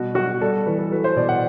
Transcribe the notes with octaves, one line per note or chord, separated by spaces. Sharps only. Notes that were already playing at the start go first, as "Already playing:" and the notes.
Already playing: B2 G3 F#4
F#3 F#4
G3 A4
E3 B4
A4
F#3 B4
C5
B2 D5
F#5